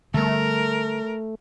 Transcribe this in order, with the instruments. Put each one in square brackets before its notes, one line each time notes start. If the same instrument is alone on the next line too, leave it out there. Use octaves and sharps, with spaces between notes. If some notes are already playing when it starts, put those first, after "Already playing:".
[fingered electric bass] D3 G3 B3 [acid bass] A3 [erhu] A#4